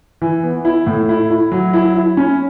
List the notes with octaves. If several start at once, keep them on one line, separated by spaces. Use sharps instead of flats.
E3
B3
E4
A2
E4
E4
F#3
E4
E4
C#4